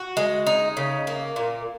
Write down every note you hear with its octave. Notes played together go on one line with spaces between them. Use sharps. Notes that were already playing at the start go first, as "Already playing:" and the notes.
Already playing: F#4
G#3
D#4
C#3
A#3
A#2